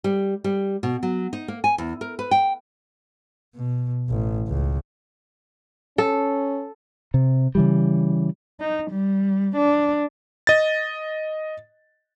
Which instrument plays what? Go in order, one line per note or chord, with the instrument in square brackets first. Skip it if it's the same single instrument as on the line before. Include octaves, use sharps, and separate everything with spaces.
[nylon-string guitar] G3
G3
B2
F#3
D#4
A#3
G#5
E2
A#4
B4
G5
[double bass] B2
A1
C#2
[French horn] C#4 [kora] A4
[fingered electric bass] C3
C#3 E3 G3
[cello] D#4
G3
D4
[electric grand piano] D#5 A6